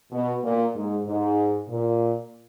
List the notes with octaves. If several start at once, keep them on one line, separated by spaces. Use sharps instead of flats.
B2
A#2
G#2
G#2
A#2